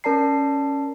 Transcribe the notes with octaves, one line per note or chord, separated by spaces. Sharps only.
C#4 A#4 D5 A5 A#5 C7